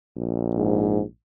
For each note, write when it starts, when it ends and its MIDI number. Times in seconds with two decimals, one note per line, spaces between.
0.17 1.03 34
0.55 1.01 44